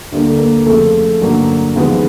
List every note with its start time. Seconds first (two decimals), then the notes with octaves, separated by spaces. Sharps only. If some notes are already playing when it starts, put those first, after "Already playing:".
0.12 D2 D3 G3 A#3
0.27 A4
0.39 A#3 A#4
0.66 F2 C#3 F3 A3 A4
1.21 G2 D3 F#3 A#3
1.76 D#2 C#3 F3 G#3 B3